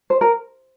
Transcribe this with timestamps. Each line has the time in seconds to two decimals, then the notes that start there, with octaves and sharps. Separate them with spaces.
0.10 C5
0.21 A#4